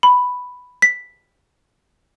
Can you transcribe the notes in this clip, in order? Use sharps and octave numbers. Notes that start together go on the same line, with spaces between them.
B5
B6